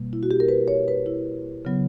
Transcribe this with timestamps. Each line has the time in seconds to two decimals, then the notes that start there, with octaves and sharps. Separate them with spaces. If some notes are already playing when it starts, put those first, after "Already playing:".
Already playing: B2 G3 A#3
0.13 E4
0.23 F#4
0.31 G4
0.40 A#4
0.48 B4
0.68 C#5
0.88 B4
1.06 E4
1.65 C#3 F#3 B3